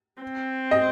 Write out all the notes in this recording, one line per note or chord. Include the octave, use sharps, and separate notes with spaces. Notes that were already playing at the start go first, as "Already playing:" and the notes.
C4
D#5